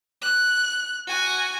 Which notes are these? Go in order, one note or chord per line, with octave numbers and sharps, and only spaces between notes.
F#6
F#4 G#5